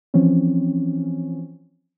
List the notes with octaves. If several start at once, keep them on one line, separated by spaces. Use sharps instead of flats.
E3 F3 C4 C#4